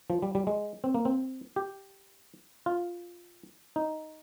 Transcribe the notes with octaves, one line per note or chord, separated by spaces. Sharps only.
F3
G3
G3
G#3
C4
A#3
C4
G4
F4
D#4